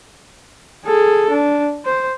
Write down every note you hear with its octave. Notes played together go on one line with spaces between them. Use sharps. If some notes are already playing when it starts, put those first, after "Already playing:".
G#4 A4
D4
C5